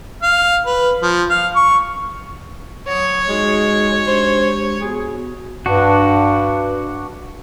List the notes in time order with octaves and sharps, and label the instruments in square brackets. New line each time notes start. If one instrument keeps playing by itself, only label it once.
[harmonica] F5
B4
F3
F5
C#6
[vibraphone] F#3 D#6 [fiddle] C#5
[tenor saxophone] G#3 [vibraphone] D#4 F#4 D#6
[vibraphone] G#3 D4 G4 [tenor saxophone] C5
[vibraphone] B3 F#4 [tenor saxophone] G#4
[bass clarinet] G2 [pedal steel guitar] D4 F#4